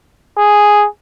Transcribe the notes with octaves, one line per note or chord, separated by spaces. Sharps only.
G#4